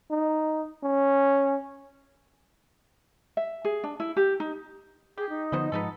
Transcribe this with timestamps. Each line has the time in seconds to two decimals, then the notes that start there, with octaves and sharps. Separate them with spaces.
0.11 D#4
0.83 C#4
3.37 E5
3.65 G#4
3.84 D4
4.00 E4
4.17 G4
4.40 D#4
5.18 G4 G#4
5.29 D#4
5.52 B2 D3 F3 B3 C5 D#5
5.72 G#2 F3 G#3 B3 D#4 A4